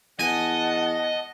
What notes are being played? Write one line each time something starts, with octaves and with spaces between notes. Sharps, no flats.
E2 D#5 F#5 G#5 A5